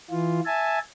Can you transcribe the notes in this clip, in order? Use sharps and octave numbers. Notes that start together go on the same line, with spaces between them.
E3 F4
E5 G#5 A5